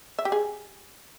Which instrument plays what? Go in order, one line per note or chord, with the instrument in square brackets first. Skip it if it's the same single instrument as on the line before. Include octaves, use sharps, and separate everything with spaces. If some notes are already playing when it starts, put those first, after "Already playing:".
[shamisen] E5
G4
G#4